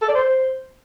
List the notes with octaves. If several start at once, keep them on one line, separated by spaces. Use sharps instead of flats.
A4
D5
C5